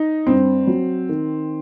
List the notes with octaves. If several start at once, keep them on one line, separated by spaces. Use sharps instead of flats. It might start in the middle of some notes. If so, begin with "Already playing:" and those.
Already playing: D#4
G2 C4
F#3
D#3